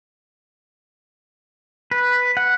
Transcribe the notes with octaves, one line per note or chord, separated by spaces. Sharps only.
B4
F#5